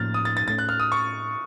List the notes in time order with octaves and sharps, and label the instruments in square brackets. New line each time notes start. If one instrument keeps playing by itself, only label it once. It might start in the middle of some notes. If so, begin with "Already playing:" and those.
Already playing: [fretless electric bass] A2 F3 A#3 C#4 [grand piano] F6 A6
[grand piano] D#6
A6
A6
[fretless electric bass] A2 A3 C#4 [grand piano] A6
[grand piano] F#6
F6
D#6
C#6